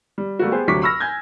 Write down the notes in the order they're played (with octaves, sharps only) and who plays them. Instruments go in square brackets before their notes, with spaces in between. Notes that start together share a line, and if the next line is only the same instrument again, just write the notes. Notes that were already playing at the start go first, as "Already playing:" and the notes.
[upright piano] G3
G3 A3 A#3 F#4
B3 G4 G#4 B4 C5
D2 C3 F#3 C#6 D6 B6
B5 C#6 E6 F6 A#6
G#5 G6 G#6